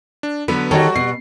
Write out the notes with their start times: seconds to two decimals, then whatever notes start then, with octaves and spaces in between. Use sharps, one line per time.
0.23 D4
0.48 D3 F#3 B3 B4
0.71 D#3 G3 F#4 A4 C#5 A#5
0.96 B2 C7